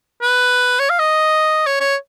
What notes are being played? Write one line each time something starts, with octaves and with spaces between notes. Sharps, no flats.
B4
C#5
F5
D#5
C#5
C#5